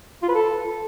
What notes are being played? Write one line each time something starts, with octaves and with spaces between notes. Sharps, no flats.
F4
B4
A4